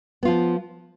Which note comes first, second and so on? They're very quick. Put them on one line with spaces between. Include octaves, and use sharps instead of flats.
B3 F4 F3